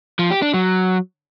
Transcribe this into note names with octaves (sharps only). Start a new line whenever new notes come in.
F3
G4
D4
F#3